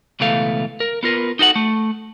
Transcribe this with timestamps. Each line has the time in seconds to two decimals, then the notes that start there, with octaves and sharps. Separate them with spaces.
0.20 C#2 B2 E3 A3 F5
0.80 A#4
1.03 B3 F4 A#4 B4
1.39 D#4 F#4 A4 F#5
1.56 A3